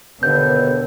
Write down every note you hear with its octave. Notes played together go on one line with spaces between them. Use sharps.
D#2 B2 D3 B3 G6